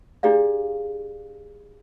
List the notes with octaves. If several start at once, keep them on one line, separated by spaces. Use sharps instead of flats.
D4 E4 G4 G#4 D5 F5